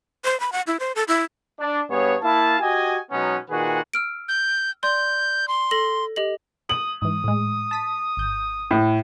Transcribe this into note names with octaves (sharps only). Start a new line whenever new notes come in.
C5
B5
F#5
E4
C5
A4
E4
D4
G2 B3 G#4 C#5
A#3 E4 F5 A5
F#4 G4 D#5 G#5
B2 F#3 G#3 B3 C#4 D#4
A#2 D#3 F#4 G#4 B4 F#5
E6 F6 D7
G6
D5 C6 G6
C6
A4 A#6 F#7
G4 D#5 F#7
D#6 F#7
G#2 E3 D#6
A2 G#3
A5 B6 D#7
G#1 G6
A2